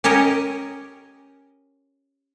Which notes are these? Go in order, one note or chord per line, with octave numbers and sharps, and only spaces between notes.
C#4 G4 A#4 C#5 D#5